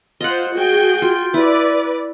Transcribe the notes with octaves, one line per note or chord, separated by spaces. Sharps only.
F4 C5 D#5 F#5
F#4 G#4 G5
F4
E4 B4 D5